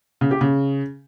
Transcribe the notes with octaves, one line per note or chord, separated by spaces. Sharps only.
C#3
G4
C#3